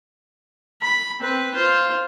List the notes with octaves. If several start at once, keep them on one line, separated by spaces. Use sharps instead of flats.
B5
C4 B4
F4 C5